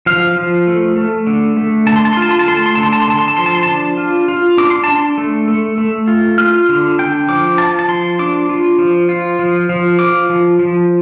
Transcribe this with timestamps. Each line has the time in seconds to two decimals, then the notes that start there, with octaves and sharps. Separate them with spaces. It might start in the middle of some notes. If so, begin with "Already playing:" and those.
0.06 F3 F5
0.36 F3
0.67 A3
0.96 A3
1.27 D3
1.57 A3
1.87 D3 A5
1.96 C6
2.05 A5
2.13 C6
2.17 F4
2.22 A5
2.31 C6
2.39 A5
2.48 A3 C6
2.57 A5
2.66 C6
2.75 D3 A5
2.83 C6
2.93 A5
3.02 C6
3.08 D3 A5
3.19 C6
3.28 A5
3.37 F3 C6
3.46 A5
3.55 C6
3.63 D4 A5
3.97 F4
4.28 F4
4.57 D4 D6
4.70 C6
4.84 D4 A5
4.96 C6
5.18 A3
5.48 A3
5.78 A3
6.08 F4
6.38 F4 F6
6.69 D3
6.99 D4 G5
7.29 F3 D6
7.58 F4 A5
7.79 A5
7.88 F3 C6
8.19 D4 D6
8.49 F4
8.79 F3
9.09 F4
9.39 F3
9.69 F3
9.99 F4 D6
10.30 F3
10.59 F3